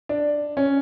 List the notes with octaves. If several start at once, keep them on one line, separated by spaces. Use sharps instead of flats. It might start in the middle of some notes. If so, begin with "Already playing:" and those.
D4
C#4